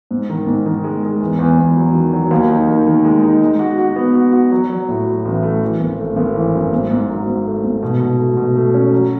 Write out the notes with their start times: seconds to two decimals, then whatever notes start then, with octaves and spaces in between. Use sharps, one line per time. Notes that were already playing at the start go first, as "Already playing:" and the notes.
0.11 G#2
0.30 D#3
0.47 G#2
0.66 D#3
0.84 G#3
1.03 G#3
1.21 E2
1.39 E2
1.58 E2
1.76 F#3
1.94 D#3
2.13 F#3
2.31 D#2
2.49 D#4
2.68 D#3
2.87 D#3
3.04 G#3
3.23 D#4
3.41 G#3
3.59 F#4
3.78 F#4
3.96 B3
4.15 F#4
4.32 F#4
4.52 F#3
4.70 F#3
4.88 A2
5.06 F#3
5.25 A1
5.43 A3
5.62 E3
5.80 G#1
5.99 A3
6.16 G#1
6.35 E3
6.54 F#2
6.72 G#2
6.90 G#2
7.09 F#3
7.27 G#2
7.45 A3
7.64 G#2
7.83 B2
8.00 B2
8.19 A3
8.37 B2
8.56 A3
8.74 C#4
8.93 F#3